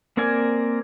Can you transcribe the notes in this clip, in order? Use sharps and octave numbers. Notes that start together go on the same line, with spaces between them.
A#3 C4 A#4 D5 G#5